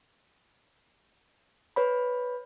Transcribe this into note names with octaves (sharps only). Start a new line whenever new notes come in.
B4 C#5 B5